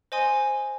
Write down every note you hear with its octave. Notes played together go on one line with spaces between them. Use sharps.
C5 D#5 G#5 C6 D#6